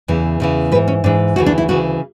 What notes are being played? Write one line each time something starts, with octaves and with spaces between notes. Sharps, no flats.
E2 C#3 E3
E2 C#3 E3
G#2 E3 B4
C#4
G#2 E3 D4
D2 C#3 E3 F#4
D4
E4
D2 C#3 E3 F#4